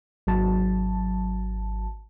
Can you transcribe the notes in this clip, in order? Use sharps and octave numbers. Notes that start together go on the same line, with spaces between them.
G#1 F#3 A5